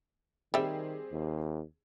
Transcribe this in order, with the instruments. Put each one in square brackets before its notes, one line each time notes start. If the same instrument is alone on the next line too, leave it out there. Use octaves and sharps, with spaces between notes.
[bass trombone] D#3 [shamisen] G3 E5 [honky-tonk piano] C4 G4 G#4
[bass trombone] D#2